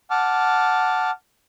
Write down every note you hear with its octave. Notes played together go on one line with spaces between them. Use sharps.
F#5 A5 D6 F6